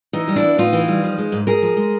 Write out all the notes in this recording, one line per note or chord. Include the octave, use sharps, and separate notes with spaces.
E3 D#4
G3
D4 E4
B3
A2 D#4 F4
E3
G3
F3
G#3
G#2
G#2 G#4 A#4
F3
G#3